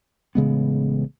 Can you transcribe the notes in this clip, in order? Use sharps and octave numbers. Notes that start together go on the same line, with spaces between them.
A1 C#3 G#3 B3